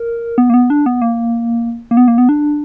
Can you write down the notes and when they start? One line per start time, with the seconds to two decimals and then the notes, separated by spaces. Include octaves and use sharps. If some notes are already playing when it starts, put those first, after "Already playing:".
Already playing: A#4
0.38 B3
0.50 A#3
0.54 B3
0.70 D4
0.86 B3
1.02 A#3
1.91 A#3
1.97 B3
2.08 A#3
2.18 B3
2.29 D4